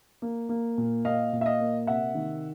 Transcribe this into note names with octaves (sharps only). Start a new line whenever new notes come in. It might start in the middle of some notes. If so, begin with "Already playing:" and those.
A#3
A#3
A#2
A#2 D#5 F5
A#2
E5
D#5 F5
A#3
C3 E5 F#5
D#3